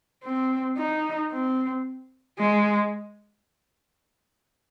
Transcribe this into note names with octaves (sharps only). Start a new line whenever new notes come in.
C4
D#4
C4
G#3